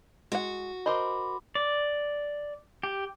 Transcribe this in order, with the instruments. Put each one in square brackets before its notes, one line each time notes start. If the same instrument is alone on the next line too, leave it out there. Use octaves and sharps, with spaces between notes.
[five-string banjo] G#3 F#5 [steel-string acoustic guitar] F#4
[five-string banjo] A#4 C5 D#5 [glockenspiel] B5 C6 D6
[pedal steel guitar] D5
G4